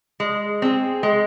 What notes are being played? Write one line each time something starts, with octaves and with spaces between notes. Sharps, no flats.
G#3
C4 G#4
G#3